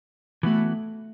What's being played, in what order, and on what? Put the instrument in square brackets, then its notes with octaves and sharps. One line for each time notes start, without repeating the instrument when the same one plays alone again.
[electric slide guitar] E3 B3 F#4 [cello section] A3